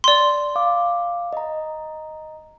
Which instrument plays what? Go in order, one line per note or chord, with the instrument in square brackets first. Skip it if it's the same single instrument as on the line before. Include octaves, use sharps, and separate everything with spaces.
[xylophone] D5 C6
[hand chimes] F5 D6
D#5 A#5